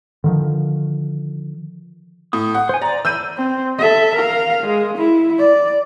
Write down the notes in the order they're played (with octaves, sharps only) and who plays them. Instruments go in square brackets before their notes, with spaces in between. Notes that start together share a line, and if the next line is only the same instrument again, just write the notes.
[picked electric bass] D3 D#3 F3
[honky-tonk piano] A2 [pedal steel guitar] D#6
[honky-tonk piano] F#5
[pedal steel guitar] C5 G#5
[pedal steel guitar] D5 [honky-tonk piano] A#5
[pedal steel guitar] E3 B5 [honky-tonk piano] E6 G6 D#7
[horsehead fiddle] C4
A4 E5
A#4 F5
G#3
E4
D5